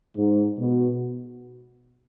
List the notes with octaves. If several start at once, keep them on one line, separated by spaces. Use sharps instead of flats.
G#2
B2